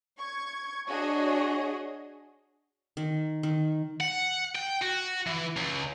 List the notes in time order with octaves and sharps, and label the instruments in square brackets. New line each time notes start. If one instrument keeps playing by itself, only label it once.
[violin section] C#6 G#6
D4 F#4 G#4 C#5 D#5
[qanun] D#3
D#3
[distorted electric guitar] F#5
G5
F#4
E3
C#2